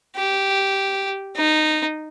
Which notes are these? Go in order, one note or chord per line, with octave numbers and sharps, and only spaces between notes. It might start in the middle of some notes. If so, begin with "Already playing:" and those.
G4
D#4